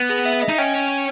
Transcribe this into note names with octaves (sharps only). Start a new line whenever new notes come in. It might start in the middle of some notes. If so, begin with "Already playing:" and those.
Already playing: B3
G#4
E5
D#5
D#4
C#4 G5